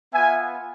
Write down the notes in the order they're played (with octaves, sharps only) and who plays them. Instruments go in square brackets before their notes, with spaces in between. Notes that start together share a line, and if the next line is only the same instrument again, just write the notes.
[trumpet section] B3 F4 E5 G#5